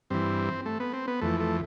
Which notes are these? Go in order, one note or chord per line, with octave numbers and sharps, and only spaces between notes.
G2 E3 C4
A3
B3
C4
B3
F2 E3 A3
A3